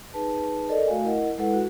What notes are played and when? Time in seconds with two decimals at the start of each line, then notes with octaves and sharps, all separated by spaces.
0.14 D#4 G#4 B4 A5
0.69 A4 A#4 D5 D#5
0.88 A3 F#4 F5 G#5
1.04 E4 A#4 D#5 F#5
1.38 G#3 E4 A4 B4 F#5
1.54 F#4